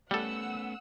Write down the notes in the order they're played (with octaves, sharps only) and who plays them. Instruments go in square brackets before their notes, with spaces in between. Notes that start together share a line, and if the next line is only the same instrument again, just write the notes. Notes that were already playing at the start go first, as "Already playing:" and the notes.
[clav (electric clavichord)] G3 A4 [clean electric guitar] A3 B3 C#4 [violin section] F#5 E6